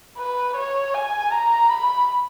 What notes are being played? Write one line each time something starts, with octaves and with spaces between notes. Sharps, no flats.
B4
C#5
G#5
A#5
B5